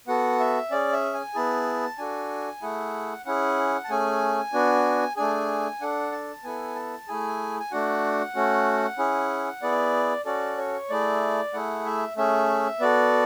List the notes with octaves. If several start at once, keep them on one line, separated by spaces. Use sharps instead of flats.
B3 F#4 A4 F#5
E5
C#4 G#4 D5
E5
G#5
B3 E4 G#4 A5
D4 F#4 A4 G#5
A3 E4 G#4 F#5
C#4 E4 G#4 F#5
A5
A3 C#4 G#4 G#5
B3 D4 F#4
A3 D4 G#4 G#5
D4 A4 F#5
A5
B3 E4 A4 G#5
A5
A3 E4 G#4 G#5
G#5
A3 D4 F#4 F#5
A3 C#4 F#4
C#4 E4 G#4
B3 E4 G#4 D5
C#4 F#4 A4 D5
C#5
A3 E4 G#4 D5
A3 E4 G#4 F#5
E5
A3 C#4 G#4 E5
B3 F#4 A4 D5